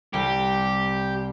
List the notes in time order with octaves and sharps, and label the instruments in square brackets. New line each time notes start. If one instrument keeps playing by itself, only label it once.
[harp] C2 [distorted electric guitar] G4